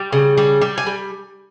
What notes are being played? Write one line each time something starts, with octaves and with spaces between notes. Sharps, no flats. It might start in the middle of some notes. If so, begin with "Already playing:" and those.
Already playing: G3 G5
C#3
G3
G3
G#5
G3